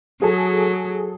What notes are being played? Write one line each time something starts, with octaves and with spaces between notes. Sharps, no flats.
F#3 G#4 A4